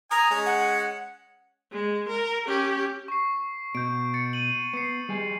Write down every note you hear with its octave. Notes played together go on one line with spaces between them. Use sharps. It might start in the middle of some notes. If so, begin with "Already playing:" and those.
G#5 A#5 D#6
G#3 C#4
F#5
G#3
A#4
C#4 G4
C#6 C7
B2 G6 D7
A6 C#7
D#7 F#7
B3 C7 C#7
G3 G#4